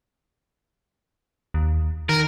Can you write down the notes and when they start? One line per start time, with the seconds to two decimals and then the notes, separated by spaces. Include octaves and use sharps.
1.54 D#2
2.09 D#3 A#4